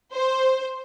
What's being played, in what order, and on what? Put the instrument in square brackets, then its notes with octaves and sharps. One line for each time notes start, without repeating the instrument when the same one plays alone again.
[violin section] C5